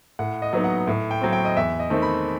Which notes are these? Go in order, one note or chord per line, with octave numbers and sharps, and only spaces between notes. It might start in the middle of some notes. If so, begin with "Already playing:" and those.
A2 F#5
D#5
F#3 B3 D#4
F#5
A2
G5
F#3 C4
G5
D#5
E2 E5
D#5
D#3 A3 C4
B5